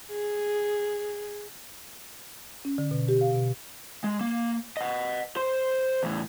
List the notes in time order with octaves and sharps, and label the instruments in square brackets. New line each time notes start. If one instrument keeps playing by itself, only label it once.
[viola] G#4
[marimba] C#4
D3
B2
G4
F5
B2
[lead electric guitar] G#3
A#3
D#5 F#5
C5 C6
E2 A2